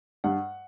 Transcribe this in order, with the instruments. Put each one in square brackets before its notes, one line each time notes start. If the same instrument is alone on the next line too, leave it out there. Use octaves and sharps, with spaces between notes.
[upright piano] G2 F#5